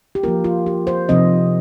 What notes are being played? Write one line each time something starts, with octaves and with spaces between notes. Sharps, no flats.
G4
F3 A#3 F4 A#4
F4
G4
C5
C3 F3 C4 D#4 D#5